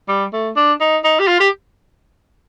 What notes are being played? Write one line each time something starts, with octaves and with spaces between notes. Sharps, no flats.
G3
A3
D4
D#4
D#4
G4
F4
G4